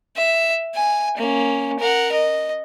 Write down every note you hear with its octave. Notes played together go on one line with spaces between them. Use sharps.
E5
G#5
A#3 C#4
A#4 F#5
D#5